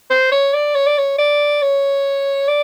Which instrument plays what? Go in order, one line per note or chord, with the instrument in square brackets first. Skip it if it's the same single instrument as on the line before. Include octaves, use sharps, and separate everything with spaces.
[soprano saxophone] C5
C#5
D5
C#5
D5
C#5
D5
C#5
D5